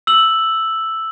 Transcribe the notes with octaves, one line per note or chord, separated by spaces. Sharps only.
E6 F#7